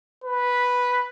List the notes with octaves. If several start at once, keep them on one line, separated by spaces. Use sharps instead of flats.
B4